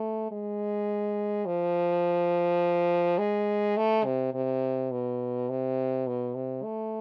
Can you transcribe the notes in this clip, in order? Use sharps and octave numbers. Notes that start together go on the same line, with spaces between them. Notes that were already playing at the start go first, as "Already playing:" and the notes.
Already playing: A3
G#3
F3
G#3
A3
C3
C3
B2
C3
B2
C3
A3